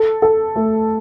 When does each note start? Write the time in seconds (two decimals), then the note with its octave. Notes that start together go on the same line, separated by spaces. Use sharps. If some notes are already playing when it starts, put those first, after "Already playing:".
Already playing: A4
0.22 A4
0.56 A3